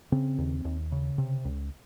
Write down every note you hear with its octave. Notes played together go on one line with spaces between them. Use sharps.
C#3 C4
D#2
D#2
C#3
C3
C#2